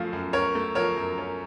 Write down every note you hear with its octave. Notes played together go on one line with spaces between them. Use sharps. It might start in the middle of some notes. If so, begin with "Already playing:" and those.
Already playing: F#2 F3 A3 C#4 F5
F#2
C#4 A#4 C#5
A3
F3 A#4 C#5
F#2
C#4